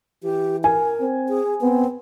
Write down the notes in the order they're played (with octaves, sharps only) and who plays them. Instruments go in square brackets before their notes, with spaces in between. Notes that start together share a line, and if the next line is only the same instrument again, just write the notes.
[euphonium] E3 [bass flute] G4
[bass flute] A#4 [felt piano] G#5
[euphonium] C4
[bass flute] G#4
[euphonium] B3 [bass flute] C4